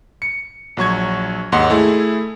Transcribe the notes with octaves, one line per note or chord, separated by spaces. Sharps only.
C#7
A#1 F#3 C#6 G#6
D#2 G#2 D#5 F#5 C6
A3 E4 G#4